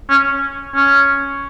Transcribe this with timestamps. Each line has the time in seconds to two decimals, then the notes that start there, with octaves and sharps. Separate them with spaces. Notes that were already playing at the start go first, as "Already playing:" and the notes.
0.10 C#4
0.75 C#4